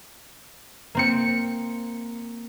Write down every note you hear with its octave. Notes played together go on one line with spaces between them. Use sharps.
A#3 C4 C#7